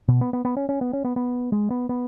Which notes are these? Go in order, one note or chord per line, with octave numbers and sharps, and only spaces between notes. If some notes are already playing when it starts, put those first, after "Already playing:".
B2
B3
B3
B3
C#4
C#4
B3
C#4
B3
B3
G#3
B3
B3